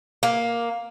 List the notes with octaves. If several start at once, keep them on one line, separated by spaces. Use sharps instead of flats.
A#3